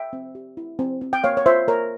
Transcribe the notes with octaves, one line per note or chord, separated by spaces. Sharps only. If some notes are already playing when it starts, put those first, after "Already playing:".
Already playing: E5 G5
C4
G4
E4
C4
C4
G5
A#3 C#5 F5
C#5
F4 C5 E5
A#3 A#4 C#5